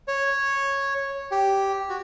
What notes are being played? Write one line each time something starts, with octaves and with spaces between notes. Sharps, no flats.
C#5
G4
F#4